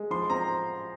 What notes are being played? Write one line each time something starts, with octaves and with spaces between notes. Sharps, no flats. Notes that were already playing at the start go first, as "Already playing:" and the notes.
Already playing: G#3
F3 C6
C4 A#5